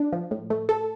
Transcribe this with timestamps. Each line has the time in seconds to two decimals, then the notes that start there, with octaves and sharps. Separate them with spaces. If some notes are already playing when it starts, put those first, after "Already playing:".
Already playing: D4
0.13 F3
0.31 A2
0.50 A3
0.69 A4